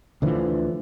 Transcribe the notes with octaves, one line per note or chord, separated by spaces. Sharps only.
D2 D3 E3 F3